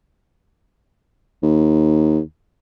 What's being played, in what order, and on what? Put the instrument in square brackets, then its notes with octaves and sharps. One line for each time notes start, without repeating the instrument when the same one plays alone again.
[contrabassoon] D#2